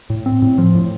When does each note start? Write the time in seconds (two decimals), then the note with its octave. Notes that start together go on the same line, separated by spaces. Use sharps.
0.10 A2
0.26 C4
0.42 A2
0.58 F3
0.75 A2